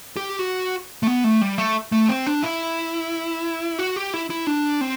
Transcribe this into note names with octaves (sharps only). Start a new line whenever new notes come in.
G4
F#4
A3
B3
A3
G3
A3
A3
C4
D4
E4
F#4
G4
E4
E4
D4
C4